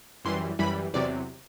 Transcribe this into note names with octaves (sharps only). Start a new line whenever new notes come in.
F#2 E3 G3 C6
F#2 E3 G3 B5
E2 C3 F#3 D5